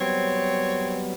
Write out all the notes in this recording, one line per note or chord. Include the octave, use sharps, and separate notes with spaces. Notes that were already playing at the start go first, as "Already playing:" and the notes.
F#3 G3 B3 C4 C#5